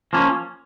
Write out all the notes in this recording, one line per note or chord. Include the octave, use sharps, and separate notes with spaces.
F3 A#3 C#4